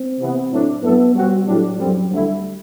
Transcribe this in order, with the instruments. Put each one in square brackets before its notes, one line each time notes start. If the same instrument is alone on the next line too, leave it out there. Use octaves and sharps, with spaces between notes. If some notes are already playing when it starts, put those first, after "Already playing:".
Already playing: [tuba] C4
[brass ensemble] C3 E3 B3
A2 F#3 A3 D4
[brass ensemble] G2 F#3 A3 E4 A4 [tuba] B3
[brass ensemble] B2 F#3 C4 F#4 [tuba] G3
[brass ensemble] A2 G3 D4 [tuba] F#3
[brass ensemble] F#2 D3 G3 C4 [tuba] F#3
[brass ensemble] D2 D3 A3 E4 [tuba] G3